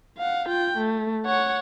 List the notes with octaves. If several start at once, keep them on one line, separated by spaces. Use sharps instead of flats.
F5 F#5
F4 G5
A3
C#5 F#5